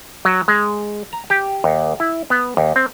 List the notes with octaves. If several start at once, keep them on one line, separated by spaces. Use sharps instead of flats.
F#3
G#3
A#5
G4
D#2
E4
B3
D#2
C4